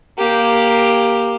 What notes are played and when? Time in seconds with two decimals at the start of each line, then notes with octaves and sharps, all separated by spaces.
0.18 A#3 G4